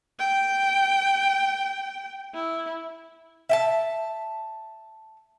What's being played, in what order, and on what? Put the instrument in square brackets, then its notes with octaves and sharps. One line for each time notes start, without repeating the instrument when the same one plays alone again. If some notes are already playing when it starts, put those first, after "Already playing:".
[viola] G5
E4
[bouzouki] E5 G5 A5